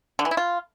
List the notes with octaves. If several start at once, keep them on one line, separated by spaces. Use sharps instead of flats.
D3
E3
E4
F4